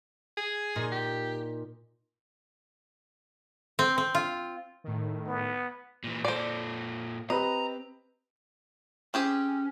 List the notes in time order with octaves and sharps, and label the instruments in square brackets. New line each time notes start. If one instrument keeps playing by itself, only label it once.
[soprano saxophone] G#4
[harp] A#2 D#4
[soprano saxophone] G4
[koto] C4
C4
F4
[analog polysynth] A2 D#3
[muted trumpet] B3
[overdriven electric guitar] A#2 E3
[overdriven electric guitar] A#2 A4 [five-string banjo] C5 D5
[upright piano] C4 G4 B4 [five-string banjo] D#5 [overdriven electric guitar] A#5
[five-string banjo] C4 G4 G#4 [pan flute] C#4